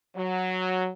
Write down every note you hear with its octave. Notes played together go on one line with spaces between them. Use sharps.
F#3